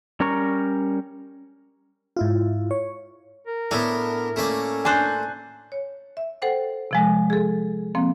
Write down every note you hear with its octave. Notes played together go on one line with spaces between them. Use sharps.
G3 C#4 A#4 A#5 C#6
G#2 E4 F4
C#5
A#4
A2 B3 D4
A3 A#3 C#4 D5
D4 C5 G#5 F#6
C#5
E5
A4 C5 F#5 G5
C3 F3 G#3
G#4 A4
F3 A#3 C4